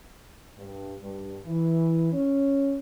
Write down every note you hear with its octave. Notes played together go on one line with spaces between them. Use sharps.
G2
G2
E3
C#4